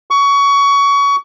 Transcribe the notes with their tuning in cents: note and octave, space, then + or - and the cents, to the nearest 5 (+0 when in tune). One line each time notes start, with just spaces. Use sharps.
C#6 +25